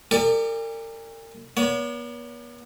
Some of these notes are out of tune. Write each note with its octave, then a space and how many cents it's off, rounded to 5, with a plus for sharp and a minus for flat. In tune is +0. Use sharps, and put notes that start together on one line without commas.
G4 +45 A#4 -40 D5 +5
B3 -40 C#5 +40